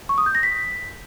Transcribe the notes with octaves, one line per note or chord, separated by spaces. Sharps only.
C#6
D#6
G6
A#6
B6